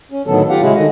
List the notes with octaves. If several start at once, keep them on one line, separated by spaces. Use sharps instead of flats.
C#4
A2 D3 D#3 F#3 B3 A4
F4 G4 F5 F#5
C#3 G#3 C#4 E4 F#4 G#4
D3 D#3 D#5